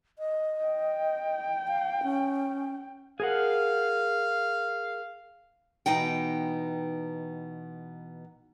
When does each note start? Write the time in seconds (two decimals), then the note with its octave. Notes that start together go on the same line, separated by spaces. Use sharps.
0.19 D#5
0.64 G5
1.68 F5
2.03 C#4
3.20 G#4 A#4 F5 F#5
5.86 B2 E3 B3 D#4 G5